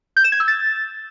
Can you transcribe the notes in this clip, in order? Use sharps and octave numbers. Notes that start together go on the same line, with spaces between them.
G6
E7
G#6
E6
A6